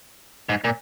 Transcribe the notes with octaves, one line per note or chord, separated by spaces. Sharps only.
G#2
A#2